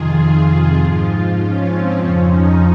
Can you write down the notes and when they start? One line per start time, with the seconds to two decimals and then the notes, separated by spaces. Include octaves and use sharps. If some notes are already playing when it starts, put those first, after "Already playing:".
Already playing: F2 C3 D#3 F4 G#4
0.79 G#2 F3
1.38 C#4
1.67 C4
1.97 F2 C#3 F3 C#4
2.27 D#4